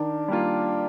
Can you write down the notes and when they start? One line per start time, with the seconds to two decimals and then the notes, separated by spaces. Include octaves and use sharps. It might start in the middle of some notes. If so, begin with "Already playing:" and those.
Already playing: D#3 D4
0.28 G3 A#3 F4